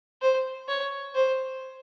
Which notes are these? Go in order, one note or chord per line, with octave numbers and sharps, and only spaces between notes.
C5
C#5
C5